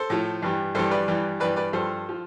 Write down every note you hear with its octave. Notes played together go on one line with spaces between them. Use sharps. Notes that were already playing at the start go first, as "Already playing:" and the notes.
Already playing: A4 C5
A2 F3
G2 E3 G3
G2 E3 G3 A4 C5
B4 D5
G2 E3 G3
G2 E3 G3 B4 D5
B4 D5
G2 F3 A4 C5
F3